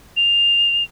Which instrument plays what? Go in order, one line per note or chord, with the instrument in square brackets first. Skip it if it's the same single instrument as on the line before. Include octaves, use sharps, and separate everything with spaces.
[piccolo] F7